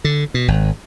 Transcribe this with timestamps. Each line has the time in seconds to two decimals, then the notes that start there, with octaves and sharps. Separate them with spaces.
0.04 D3
0.34 B2
0.48 G#1